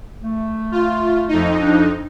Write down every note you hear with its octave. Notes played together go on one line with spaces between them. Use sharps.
A3
F4
F2 D#4
D4